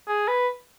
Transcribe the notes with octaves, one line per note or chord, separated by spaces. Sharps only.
G#4
B4